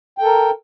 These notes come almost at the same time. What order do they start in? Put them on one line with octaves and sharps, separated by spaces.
G5 A4 A#4